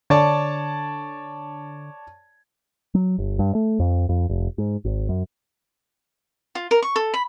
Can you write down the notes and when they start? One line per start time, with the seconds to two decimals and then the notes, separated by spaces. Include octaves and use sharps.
0.10 D3 C#5 D5 A5
2.95 F#3
3.18 G1
3.39 G2
3.55 A3
3.79 F2
4.09 F2
4.29 F1
4.58 G#2
4.85 G#1
5.09 F#2
6.55 F4
6.71 A#4
6.82 C#6
6.96 A4
7.14 B5